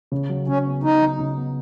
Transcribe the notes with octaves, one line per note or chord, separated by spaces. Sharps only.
C#3
F#3
C#3 C#4
B3
C#3 D#4
F#3
C#3
B3